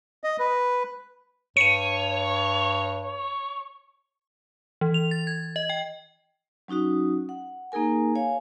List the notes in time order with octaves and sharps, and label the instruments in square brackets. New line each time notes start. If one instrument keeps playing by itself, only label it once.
[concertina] D#5
B4
[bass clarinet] G2 [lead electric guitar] C#5 [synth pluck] C#7 D#7
[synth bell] E3
F7
A6
G#6
D#5
G5
[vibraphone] F#3 C#4 D#4 F#4 D#6
F#5
A#3 D#4 G#4 A#4 G#5
C#5 F5 G#5